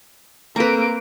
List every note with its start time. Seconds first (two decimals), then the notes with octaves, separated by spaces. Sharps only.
0.56 A#3 C4 A4 B4 A#5 D7